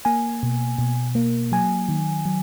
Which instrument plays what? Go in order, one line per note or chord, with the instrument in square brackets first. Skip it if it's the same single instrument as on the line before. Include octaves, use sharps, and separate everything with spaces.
[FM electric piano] A#3 G#5
B2
B2
A#3
F#3 G#5
D#3
F#3